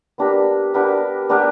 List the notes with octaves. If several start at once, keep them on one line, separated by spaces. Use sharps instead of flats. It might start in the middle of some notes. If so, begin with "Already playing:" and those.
B3 D4 G4 A#4
B3 D4 G4 A#4
B3 D4 G4 A#4